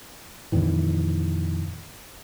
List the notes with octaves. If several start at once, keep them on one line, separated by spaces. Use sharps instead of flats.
F2 A#2 D#3 E3